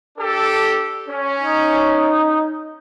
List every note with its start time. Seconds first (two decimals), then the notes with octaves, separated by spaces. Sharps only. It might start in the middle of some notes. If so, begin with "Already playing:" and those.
0.18 D4 G4 A4
1.08 C#4
1.39 D#4